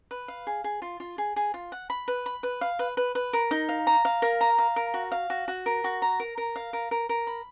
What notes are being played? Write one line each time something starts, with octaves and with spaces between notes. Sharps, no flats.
B4
F5
G#4
G#4
F4
F4
G#4
G#4
F4
F#5
B5
B4
B5
B4
F5
B4
B4
B4
A#4
D#4
F5
A#5
F5
A#4
A#5
F5
A#4
F#4
F5
F#4
F#4
A#4
F#4
A#5
A#4
A#4
F5
A#4
A#4
A#4
B5